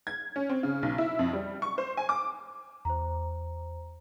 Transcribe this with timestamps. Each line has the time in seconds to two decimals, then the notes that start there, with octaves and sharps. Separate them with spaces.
0.07 G#6
0.36 C#4
0.49 C4
0.63 C#3
0.83 B1
0.98 E4
1.19 F2
1.33 G3
1.62 C#6
1.78 C5
1.97 G#5
2.09 D6
2.85 E2 C5 A#5